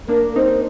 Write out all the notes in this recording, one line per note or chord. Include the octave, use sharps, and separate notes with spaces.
A#3 D4 A#4
C4 D#4 C5